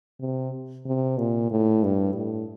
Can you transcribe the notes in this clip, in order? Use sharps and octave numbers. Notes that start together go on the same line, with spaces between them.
C3
C3
A#2
A2
G2
A2